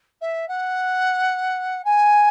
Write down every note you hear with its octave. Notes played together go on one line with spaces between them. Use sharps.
E5
F#5
G#5